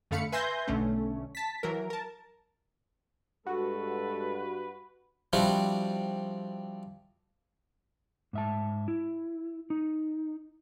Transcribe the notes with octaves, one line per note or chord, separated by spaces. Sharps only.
F#2 D3 A3 F5 B5 C#7
B4 E5 G#5 C6 G6 A#6
B1 D3 A3 C#4
A5 B6
E3 F#3 A#4
A#4 A5
G2 G#3 F#4 A4 B4
F3 G3 C4 D4 E4 F#4
G#2 E5 A5
E4
D#4